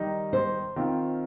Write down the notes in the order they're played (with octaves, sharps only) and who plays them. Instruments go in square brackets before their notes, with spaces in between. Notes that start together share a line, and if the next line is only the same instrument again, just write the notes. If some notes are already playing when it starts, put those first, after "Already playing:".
Already playing: [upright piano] D#3 G3 D#4
[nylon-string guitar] C5
[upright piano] D#3 C4 F4